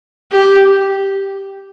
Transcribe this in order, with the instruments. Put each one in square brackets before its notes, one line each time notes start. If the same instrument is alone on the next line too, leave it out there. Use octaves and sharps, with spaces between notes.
[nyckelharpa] G4